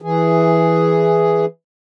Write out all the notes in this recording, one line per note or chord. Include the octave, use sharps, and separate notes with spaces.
E3 G#4